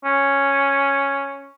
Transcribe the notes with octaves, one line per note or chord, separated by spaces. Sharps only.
C#4